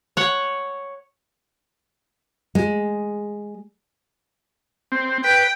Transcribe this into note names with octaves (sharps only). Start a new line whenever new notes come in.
C#5 F#5
G#3
C4
B4 G5